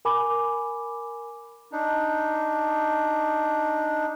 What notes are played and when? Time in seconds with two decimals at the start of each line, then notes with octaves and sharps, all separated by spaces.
0.05 A#4 G#5 B5 D6
1.72 D4 D#4